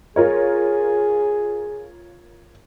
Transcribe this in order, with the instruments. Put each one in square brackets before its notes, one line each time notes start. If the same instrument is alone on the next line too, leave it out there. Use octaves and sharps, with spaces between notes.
[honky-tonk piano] F4 A#4 C#5 [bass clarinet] G#4